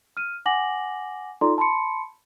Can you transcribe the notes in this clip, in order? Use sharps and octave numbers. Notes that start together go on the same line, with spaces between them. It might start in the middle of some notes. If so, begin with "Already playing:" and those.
F6 D#7
F#5 G#5 D6 A#6 F#7
D#4 F4 A4 D5 A#5 C6
A5 B5 C6 C#7